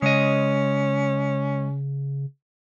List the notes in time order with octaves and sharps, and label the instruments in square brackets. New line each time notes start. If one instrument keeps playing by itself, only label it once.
[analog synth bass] C#3 [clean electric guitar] G#3 D#5 [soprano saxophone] C#4